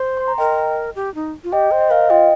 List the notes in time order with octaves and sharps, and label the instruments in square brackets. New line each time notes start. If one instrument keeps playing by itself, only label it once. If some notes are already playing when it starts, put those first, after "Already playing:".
Already playing: [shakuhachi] C5
[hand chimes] C6
A#5
[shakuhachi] A#4 [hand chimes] D#5 G5
[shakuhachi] G4
D#4
F4
[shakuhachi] G4 [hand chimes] D#5 G5
[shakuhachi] C5
[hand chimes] D#5
[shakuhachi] A#4 [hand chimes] C5 F5
[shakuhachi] F4 [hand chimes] D#5 G5